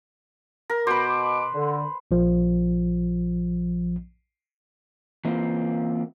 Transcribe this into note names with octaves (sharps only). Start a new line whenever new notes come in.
A#4
B2 B4 C5 D6
D3
A#1 F3
E3 A#3 C4 F4